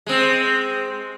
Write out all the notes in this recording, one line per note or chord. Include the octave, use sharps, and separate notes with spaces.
G#3 C4